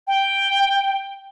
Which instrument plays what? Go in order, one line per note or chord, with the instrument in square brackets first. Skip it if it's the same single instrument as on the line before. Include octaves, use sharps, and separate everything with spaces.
[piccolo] G5